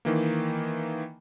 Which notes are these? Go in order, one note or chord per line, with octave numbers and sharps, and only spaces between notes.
D#3 E3 A#3